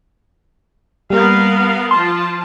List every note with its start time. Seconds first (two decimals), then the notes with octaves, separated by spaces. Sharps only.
1.10 G3 A#3 B3 A#4 F5
1.91 F3 F4 A5 C6